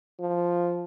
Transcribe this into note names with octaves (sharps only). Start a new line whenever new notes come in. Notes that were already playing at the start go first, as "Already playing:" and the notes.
F3